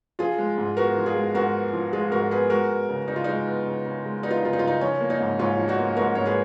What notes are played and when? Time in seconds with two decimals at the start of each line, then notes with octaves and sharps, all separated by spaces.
0.19 F3 F4 G#4
0.38 G#3
0.58 G#2
0.77 B3 F#4 A#4
0.97 F3
1.06 F4 G#4
1.15 G#3
1.35 G#2 F#4 A#4
1.55 B3
1.73 F3
1.93 G#3 F4 G#4
2.12 G#2 F#4 A#4
2.31 B3 G#4 B4
2.50 G#3 F#4 A#4
2.70 B3
2.89 C#3
3.08 C#3 D#4
3.16 F4
3.24 G#3 D#4
3.47 B3
3.66 C#3
3.85 C#3
4.05 G#3
4.23 B3 D#4
4.31 F4
4.38 D#4
4.43 C#3 F4
4.53 D#4
4.59 F4
4.62 C#3
4.67 D#4
4.81 F3 C#4
5.01 A#3
5.10 D#4
5.20 G#2
5.39 G#2 C#4 F4
5.58 F3
5.68 D#4 F#4
5.79 A#3
5.97 G#2 F#4 A#4
6.15 G#2 C#5
6.26 G#4 B4